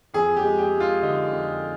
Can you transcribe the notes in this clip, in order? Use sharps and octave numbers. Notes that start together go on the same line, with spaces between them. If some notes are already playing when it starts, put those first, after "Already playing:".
F2 G#4
G4
G#3
G4
G#3
F4
D3 D#4
F2